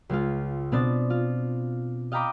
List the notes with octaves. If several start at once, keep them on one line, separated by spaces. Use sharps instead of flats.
C#2 G#3 F4
B2 B3 C4 D4 A6
F4
D#5 F5 G5 A#5 B5 D6